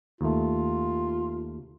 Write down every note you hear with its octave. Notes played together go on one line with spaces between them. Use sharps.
D#2 A3 F4